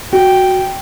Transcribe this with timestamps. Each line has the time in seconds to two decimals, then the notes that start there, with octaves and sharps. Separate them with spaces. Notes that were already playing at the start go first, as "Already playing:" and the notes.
0.13 F#4 G5